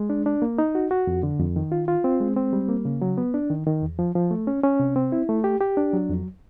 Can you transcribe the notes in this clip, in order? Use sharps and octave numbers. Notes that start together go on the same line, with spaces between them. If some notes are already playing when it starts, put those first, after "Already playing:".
Already playing: G#3
D4
D4
A#3
D#4
F#4
F#4
F2
D3
F2
D#3
F4
F4
C4
G#3
C4
G3
A#3
C#3
F#3
B3
D4
D#3
D#3
E2
F3
F3
A3
C#4
C#4
C3
C4
E4
A3
G4
G4
D4
F#3
F2